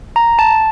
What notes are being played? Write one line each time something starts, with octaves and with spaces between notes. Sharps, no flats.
A#5
A5